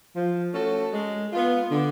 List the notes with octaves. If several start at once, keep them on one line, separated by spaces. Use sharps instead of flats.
F3
A3 C#4 F#4 A4
G#3
B3 F4
D3